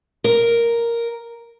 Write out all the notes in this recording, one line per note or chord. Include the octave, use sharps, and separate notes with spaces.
A#4